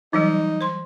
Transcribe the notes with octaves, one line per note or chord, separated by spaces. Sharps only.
E3 F#3 G3 D#4
C5 C6